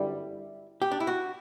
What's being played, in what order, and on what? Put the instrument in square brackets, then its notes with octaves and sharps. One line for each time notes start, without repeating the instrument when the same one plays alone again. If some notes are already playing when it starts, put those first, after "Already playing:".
Already playing: [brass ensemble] G1 F#2 D3 G3 [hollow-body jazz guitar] E4
[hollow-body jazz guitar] G4
D4
E4
F#4